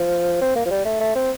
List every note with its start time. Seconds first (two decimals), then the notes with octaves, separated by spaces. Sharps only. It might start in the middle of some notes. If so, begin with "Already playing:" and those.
Already playing: F3
0.42 C4
0.56 A#3
0.66 F3
0.71 G3
0.85 A3
1.01 A3
1.15 C4